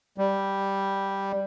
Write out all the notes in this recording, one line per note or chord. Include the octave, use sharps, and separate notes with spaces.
G3